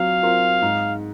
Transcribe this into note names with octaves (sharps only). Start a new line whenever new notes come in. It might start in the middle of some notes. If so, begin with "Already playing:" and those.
Already playing: F#3 C4 F4 F5
C4 F4 A#4
G#2